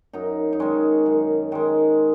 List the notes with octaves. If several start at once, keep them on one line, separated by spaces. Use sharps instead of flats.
F#2 D#4
D#4
D#3 G#3 C#4
F#2
D#3 G#3